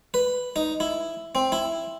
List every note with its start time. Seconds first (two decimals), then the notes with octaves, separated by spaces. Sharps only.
0.14 B4
0.56 D#4
0.80 E4
1.35 C4
1.52 E4